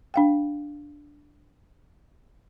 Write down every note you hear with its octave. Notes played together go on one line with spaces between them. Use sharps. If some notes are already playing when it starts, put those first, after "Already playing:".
D4 F5 G5